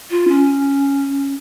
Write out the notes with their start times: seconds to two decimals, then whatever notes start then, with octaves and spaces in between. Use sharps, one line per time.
0.11 F4
0.28 C#4